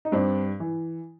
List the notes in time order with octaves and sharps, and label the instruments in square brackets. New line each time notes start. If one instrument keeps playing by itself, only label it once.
[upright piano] D#4
G2 C4 D4
E3